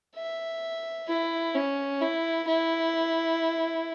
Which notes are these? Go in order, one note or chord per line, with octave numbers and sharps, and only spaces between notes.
E5
E4
C#4
E4
E4